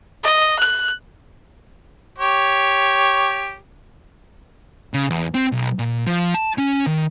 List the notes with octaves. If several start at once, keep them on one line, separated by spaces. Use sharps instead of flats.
D#5
F#6
G4 C#5
C#3
E2
C4
B1
A#2
F3
A5
C#4
D#3